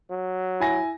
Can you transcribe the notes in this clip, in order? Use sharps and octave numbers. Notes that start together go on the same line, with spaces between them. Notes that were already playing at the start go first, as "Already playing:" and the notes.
F#3
E4 G#5 A#6